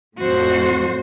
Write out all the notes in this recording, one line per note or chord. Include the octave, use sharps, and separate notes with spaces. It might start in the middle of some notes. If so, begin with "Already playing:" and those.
F2 A2 F#4 C5